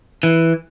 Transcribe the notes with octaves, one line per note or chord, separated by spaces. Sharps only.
E3